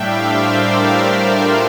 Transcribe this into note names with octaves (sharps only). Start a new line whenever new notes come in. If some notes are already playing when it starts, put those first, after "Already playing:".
Already playing: A2 G3 D4 D5 E5 F5 G5
C5 E5
A#4 D5
F4 A4